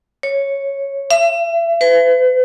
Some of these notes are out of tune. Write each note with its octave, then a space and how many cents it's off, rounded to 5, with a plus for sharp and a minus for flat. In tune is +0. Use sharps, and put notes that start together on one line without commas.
C#5 -5
E5 +35
B4 +45